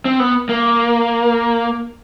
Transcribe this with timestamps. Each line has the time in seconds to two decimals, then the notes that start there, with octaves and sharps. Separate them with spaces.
0.05 C4
0.20 B3
0.49 A#3